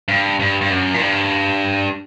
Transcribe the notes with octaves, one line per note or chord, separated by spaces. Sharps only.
G2
G2
G2
F#2
A#2
G2